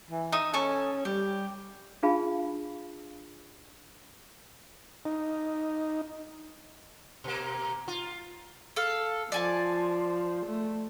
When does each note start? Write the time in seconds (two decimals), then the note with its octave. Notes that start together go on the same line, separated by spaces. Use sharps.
0.10 E3
0.32 D#4 E5 D#6
0.54 C#4 A4 G#5 C#6
1.05 G3 G4
2.03 D4 F4 G#4 F5 A5 B5
5.05 D#4
7.24 B2 A#3
7.88 F4
8.76 A4 F5
9.32 F3 D5 G#5 A5
10.46 A3